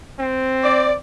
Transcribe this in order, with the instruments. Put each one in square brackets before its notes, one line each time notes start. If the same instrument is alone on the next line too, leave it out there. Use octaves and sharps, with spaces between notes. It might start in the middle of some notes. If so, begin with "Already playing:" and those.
[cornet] C4
[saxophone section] D5